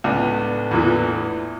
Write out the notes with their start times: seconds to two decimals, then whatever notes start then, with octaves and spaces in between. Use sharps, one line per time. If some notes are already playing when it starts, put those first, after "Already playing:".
0.04 C#2 A2 B3 D4
0.71 E2 A#2 E3